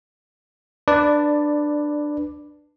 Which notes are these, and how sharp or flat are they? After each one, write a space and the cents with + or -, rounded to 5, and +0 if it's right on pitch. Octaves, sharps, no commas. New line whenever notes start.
D4 +15 B4 +0 D5 +0